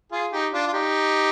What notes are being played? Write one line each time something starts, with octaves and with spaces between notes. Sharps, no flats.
F4 G#4
D#4 G4
D4 F4
F4
D#4 G4